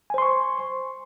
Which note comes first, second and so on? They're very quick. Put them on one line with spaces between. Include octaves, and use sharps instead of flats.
G#5 C5 C6 C#6